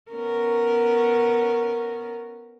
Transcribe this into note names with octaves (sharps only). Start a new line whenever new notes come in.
B3 C#4 A#4